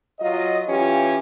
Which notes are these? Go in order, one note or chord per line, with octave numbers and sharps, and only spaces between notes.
F#3 F4 D#5
E3 C#4 F4 G4